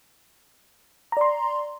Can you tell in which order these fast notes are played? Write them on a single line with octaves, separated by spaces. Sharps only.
A#5 D5 C6